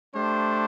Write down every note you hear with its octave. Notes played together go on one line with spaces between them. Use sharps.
A3 D4 G4 C5